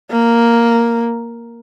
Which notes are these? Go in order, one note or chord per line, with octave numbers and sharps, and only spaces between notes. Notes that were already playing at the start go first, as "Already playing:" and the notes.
A#3